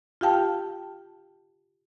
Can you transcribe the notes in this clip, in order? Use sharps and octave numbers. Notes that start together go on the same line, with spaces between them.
F4 G4 F5 G5 A5